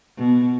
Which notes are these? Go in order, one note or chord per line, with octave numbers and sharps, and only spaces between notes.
B2